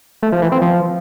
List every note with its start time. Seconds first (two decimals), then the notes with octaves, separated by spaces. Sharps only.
0.23 A3
0.32 F3
0.42 E3
0.52 C4
0.62 F3